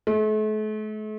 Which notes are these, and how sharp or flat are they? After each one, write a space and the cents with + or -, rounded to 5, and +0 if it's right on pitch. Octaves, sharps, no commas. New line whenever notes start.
A3 -40